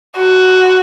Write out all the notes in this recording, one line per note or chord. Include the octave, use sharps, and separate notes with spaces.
F#4